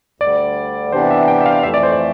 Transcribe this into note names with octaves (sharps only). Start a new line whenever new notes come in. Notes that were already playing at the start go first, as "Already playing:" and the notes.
D2 D3 G3 D5
C3 E3 B3 D4 G4 C5
E5
G5
E5
F5
F2 E3 A3 E5
D5
C5
D5